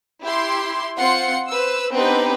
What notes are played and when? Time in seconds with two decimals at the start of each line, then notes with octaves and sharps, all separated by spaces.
0.23 E4 G4 C6
0.98 C4 F4 F#5 C6 C#7
1.49 B4 C5 E6
1.92 B3 C4 D4 D#4 G4 B4